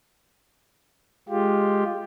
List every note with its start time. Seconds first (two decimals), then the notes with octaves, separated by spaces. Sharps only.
1.29 G#3 F4 G4